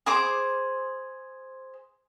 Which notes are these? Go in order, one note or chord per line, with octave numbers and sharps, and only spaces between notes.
G#4 C5 D6